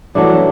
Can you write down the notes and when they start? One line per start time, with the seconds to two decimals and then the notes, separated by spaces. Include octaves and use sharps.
0.15 E3 F#3 A3 D4